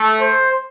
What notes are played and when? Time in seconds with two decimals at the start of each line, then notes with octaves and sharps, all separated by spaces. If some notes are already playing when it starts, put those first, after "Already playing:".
Already playing: A3
0.21 C5